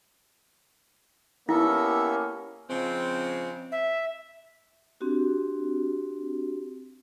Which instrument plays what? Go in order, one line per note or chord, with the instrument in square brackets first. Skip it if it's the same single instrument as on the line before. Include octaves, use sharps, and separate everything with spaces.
[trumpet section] A#3 C#4 G4 [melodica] B3 A4 E5 [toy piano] E4
[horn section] C#3 F3 G#3 C4
[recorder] E5
[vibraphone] C4 D4 F#4 G4